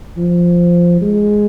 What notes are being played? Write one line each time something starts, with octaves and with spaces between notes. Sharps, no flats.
F3
G#3